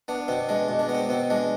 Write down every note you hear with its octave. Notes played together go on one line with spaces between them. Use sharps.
B3 D4
B2 C4
G#3 D4
B2
D4
B3
C4
B2 C4
G#3 D4